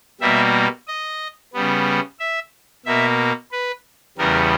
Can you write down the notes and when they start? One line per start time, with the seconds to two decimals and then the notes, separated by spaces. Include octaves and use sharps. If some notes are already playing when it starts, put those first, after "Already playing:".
0.21 B2 G3 A#3 E5
0.88 D#5
1.54 C#3 G3 B3
2.19 E5
2.86 B2 A#3 E5
3.52 B4
4.18 E2 C#3 G3 B3 A#4